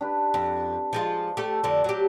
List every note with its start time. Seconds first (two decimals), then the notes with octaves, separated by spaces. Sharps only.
0.01 D4 G4 B4
0.34 F2
0.93 F3 G#3 F4
1.37 A3 G4 A4 A5
1.64 F2 D3
1.84 F#3 G4